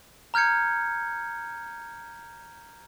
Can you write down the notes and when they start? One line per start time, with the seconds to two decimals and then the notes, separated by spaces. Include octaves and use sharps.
0.34 A#5 F6 G6 G#6 C#7